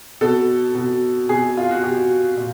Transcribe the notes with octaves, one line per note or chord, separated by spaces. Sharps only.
B2 A4
B2
B2 G#4
F4
F#4
B2 G4
A#2